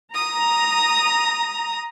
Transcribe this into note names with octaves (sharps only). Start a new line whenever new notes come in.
A#5 D#6